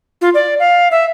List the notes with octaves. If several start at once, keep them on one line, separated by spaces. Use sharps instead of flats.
F4
D5
F5
E5